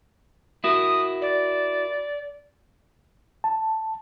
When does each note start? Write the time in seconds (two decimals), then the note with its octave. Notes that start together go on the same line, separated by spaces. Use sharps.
0.64 E4 F#4 A#4 D#6
1.22 D5
3.44 A5